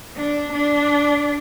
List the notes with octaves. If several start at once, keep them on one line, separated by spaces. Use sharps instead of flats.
D4
D4